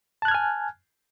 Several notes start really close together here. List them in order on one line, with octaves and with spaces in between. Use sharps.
A5 F#6 G#6 F6 G#5